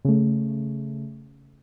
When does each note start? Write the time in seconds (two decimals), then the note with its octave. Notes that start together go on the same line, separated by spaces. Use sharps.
0.05 C#3 A3